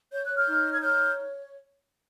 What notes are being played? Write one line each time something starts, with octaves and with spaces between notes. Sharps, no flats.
C#5 G6
F#6
F6 G6
D#4
G#6
C#5 F6 G6